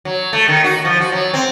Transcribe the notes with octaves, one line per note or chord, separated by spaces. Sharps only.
F#3
A3
D#3
F#4
F3
F#4
F#3
C4